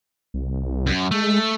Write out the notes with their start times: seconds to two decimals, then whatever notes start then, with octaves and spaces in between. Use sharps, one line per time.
0.34 C2
0.87 F#2
1.11 G#3 A3